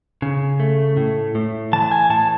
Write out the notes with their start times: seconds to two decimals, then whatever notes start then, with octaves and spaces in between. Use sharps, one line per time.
0.22 C#3
0.60 A3
0.97 A2
1.35 A2
1.73 E3 A5
1.91 G#5
2.10 A2 A5